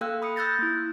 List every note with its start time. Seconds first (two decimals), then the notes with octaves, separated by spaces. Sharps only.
0.01 A#3 A4 F5 G5 E6 F#6
0.22 B5 D#6 E6 C#7
0.36 D#6 E6 F#6 G6 A6 A#6
0.59 A#3 E4